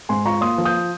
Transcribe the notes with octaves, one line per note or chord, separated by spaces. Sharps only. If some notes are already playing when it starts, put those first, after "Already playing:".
G#2 G#5 C6
F4 A#5 C#6
A#3 C6 D#6
F3
D#6 G6